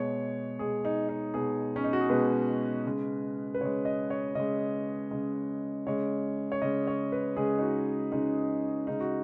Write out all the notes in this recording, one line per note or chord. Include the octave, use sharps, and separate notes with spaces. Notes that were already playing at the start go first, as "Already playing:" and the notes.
Already playing: B2 G#3 C#5
B2 G#3 G#4
D#4
D#4
B2 G#3 G#4
C#4
D#4
F#4
G#4
B2 G#3 B4
C#3 G#3
B4
C#3 G#3 C#5
D#5
C#5
C#3 G#3 D#5
C#3 G#3
C#3 G#3 C#5
C#5
C#3 G#3 D#5
C#5
B4
C#3 G#3 G#4
D#4
F#4
C#3 G#3 D#4
C#3 G#3 D#4
F#4